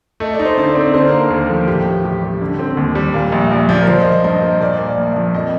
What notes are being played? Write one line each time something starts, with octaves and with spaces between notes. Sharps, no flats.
A3 D#5
D5
D#4
C5
D3 D5
C4
D3 C5
A#4
A#3
A#4
D#2 A4
F3
A2 G4
A1
A1 G4
G3
D3
C4
D#2
G3
A#2 F5
A#1
A#1 D5
F3
A#4
F3 C5
D#5
F4
D#5
G2 D#5
A#3
A#2 D5
A#3
A#1
F3
F2 D#5